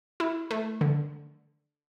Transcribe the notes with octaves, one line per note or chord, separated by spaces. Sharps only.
E4
A3
D3